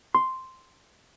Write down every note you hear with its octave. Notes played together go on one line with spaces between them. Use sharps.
C6